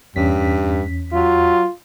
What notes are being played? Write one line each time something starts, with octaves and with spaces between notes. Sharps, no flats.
E2 G2 C#4 B6
F#3 F4